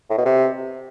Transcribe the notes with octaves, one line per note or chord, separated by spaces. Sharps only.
A2
B2
C3